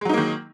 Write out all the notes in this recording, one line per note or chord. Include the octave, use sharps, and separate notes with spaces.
D#3 F#3 G#3 A#3 D#4